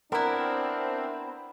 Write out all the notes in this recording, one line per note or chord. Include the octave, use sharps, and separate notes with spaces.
B3 C4 D4 E4 A#4